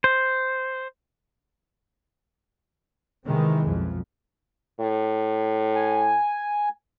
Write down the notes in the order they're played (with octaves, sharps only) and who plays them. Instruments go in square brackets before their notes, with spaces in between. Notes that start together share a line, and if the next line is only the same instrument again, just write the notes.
[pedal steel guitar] C5
[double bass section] C3 D#3 E3 G#3
B1 F2
[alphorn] A2
[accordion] G#5